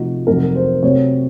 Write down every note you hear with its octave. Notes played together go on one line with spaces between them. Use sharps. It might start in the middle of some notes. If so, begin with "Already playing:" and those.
Already playing: C3 F3 A3 D#4 F#4
F2 C3 F#3 A3 D#4 A#4
C5
C3 F#3 A3 C4 C#5